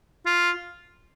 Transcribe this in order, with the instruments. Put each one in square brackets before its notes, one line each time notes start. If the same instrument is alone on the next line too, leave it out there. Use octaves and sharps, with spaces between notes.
[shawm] F4